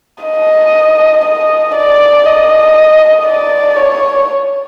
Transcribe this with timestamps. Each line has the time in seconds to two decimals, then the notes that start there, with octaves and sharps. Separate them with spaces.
0.25 D#5
1.25 D#5
1.75 D5
2.25 D#5
3.25 D5
3.76 C#5